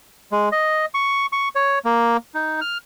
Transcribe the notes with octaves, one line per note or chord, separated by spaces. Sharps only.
G#3
D#5
C#6
C#6
C#5
A#3
D#4
F6